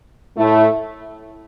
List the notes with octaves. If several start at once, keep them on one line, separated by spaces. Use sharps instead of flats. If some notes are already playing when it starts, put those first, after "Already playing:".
A2 A3 E4